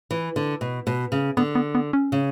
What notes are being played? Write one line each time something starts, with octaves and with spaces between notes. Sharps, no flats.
E3
D3
B2
B2
C#3
D3 B3
B3
B3
C#4
C#3